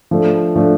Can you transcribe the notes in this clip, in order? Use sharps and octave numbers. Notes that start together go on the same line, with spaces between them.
F3 A3 D4
F3 A3 D4